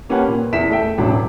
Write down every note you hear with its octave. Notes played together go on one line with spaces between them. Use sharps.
A#3 C#4 G4 B4 F#5 A5
A#2
E2 E5 B6 E7
A3 E5 G5
E1 A1 F#3 D4